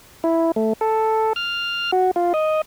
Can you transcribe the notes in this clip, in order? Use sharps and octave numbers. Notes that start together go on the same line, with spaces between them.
E4
A3
A4
F6
F#4
F4
D#5